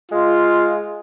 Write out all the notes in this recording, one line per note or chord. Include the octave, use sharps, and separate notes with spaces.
G#3 F4